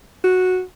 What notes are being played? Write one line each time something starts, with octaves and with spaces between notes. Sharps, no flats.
F#4